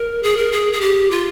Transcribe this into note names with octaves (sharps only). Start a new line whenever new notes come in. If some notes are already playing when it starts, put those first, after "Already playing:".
Already playing: A#4
G#4
A#4
G#4
G#4
G4
F4